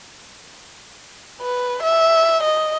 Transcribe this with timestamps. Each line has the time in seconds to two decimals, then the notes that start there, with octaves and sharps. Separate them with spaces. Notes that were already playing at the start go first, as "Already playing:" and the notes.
1.41 B4
1.83 E5
2.43 D#5